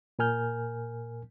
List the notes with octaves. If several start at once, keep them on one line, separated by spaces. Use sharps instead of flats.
A#2 A#4 G#5 F6 G6